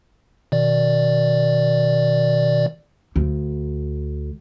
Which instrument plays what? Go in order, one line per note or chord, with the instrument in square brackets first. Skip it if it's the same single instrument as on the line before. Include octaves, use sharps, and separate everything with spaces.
[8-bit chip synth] B2 D#3 D5
[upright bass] D2